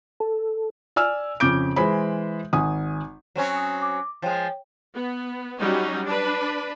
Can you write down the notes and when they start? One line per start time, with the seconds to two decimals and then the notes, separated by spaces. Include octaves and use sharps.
0.20 A4
0.96 D5 G#5 E6 F6
1.40 F2 C#3 D6 G6 D7
1.76 E3 G#3 C5 B5
2.53 G#1 G#5 D#6
3.36 F#3 C4 C#4
3.57 D#6
3.82 D6
4.22 F3 G#3 C#5 G5
4.95 B3
5.60 F#3 G3 C#4 D#4
6.05 D4 B4